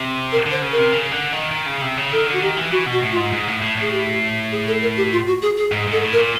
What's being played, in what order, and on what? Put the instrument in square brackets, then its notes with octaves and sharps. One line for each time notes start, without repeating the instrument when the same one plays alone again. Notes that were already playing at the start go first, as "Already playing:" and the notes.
Already playing: [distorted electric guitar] C3
[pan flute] A#4
[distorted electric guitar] D3
[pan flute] C5
[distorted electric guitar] C#3
[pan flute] A#4
[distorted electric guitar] C3
C#3
D3
D#3
D#3
C#3
C3
C#3
[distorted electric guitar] D#3 [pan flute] A4
[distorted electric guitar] D3
[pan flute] F#4
[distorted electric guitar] D#3 [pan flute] G4
[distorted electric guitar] E3
[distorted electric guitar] E3 [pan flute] F#4
[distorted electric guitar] B2
[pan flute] F#4
[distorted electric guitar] A2
[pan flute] F4
[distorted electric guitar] G#2
G#2
A2
A2
[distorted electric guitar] A2 [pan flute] G#4
[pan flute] G4
G#4
A4
A#4
G4
F4
F#4
G#4
G#4
[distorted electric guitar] G#2
[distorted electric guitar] G#2 [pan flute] A4
[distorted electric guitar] A2
[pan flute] A#4
[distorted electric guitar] A#2